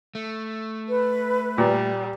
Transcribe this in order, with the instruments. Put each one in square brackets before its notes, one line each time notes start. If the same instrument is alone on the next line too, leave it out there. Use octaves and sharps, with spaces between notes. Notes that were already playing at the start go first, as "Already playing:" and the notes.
[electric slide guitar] A3
[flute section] B4
[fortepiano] A#2 [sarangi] G3